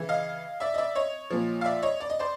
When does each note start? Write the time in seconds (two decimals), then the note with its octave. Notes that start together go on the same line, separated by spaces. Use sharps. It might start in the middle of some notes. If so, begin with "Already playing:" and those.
Already playing: C#3 E3
0.09 D#5 F5
0.60 D5 E5
0.74 D#5
0.78 D5 E5
0.95 C#5 D#5
1.30 A#2 F3
1.61 F5
1.65 D5 E5
1.82 C#5 D#5
2.00 D5
2.10 D#5
2.19 C5 D5